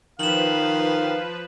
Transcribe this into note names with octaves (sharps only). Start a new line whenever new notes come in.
D#3 F3 B4 F5 E7 F#7